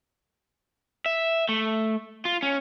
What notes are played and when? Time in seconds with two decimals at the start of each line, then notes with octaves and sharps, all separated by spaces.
1.06 E5
1.49 A3
2.25 F4
2.42 C#4